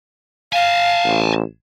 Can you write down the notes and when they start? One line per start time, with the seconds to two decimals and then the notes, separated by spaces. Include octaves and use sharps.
0.53 F5 G#5 A5
1.05 A1